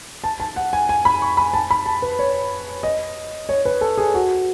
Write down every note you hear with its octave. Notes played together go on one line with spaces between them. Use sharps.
A5
A5
F#5
G#5
G#5
B5
C#6
B5
A5
B5
A5
B4
C#5
D#5
C#5
B4
A4
G#4
F#4